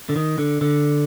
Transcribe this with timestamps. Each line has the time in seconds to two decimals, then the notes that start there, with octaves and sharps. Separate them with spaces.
0.09 D3
0.16 D#3
0.38 D3
0.61 D3